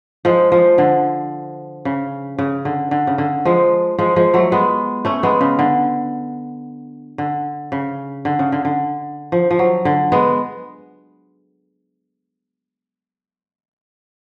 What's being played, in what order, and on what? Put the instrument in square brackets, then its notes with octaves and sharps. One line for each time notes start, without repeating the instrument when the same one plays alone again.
[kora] F3 G#3
F3
D3
C#3
C#3
D3
D3
C#3
D3
F3 G#3
F3 G#3
F3 G#3
F#3 A3
G#3 B3
A3 C#4
G#3 B3
C#3
D3
D3
C#3
D3
C#3
D3
D3
F3
F3
F#3
D3
G#3 B3